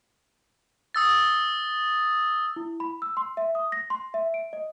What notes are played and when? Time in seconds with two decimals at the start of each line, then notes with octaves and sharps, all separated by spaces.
0.95 D#6 E6 A6
2.56 E4
2.80 B5
3.02 E6
3.17 C6
3.37 E5
3.55 D#6
3.72 A#6
3.90 C6
4.14 E5
4.34 D7
4.53 D#5